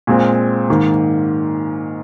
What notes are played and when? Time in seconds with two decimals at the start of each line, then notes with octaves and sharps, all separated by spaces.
0.07 A#2 G#3 C4
0.68 G#2 D#3 A#3